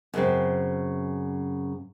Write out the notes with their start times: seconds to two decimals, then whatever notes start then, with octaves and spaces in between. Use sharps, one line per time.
0.14 F#2 C#3 C4